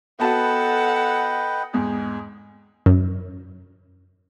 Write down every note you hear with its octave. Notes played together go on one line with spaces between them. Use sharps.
B3 F#4 A4 B4 D#5 F#5 G5 A5
E2 G#2 G#4
F#2